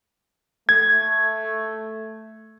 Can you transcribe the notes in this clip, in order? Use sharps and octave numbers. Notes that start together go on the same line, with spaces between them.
A3 G#6